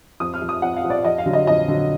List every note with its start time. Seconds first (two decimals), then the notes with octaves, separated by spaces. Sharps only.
0.20 F2 D#6
0.34 F6
0.42 F3
0.49 D#6
0.62 F2 F#5
0.76 F5
0.84 F3
0.90 D5
1.04 F2 D#5
1.18 F5
1.26 D3 F#3
1.33 D#5
1.47 F2 D#5
1.68 D3 F#3